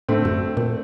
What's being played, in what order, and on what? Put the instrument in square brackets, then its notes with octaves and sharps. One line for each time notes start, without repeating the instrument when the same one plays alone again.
[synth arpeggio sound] A2 [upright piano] D3 A3 C4
[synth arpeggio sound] F#2
A#2